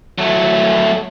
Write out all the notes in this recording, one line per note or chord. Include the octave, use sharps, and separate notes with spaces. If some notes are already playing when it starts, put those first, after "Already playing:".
F#3 A3